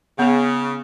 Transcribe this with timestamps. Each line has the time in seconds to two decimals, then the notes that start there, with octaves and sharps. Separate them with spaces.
0.19 C#3 B3 G#4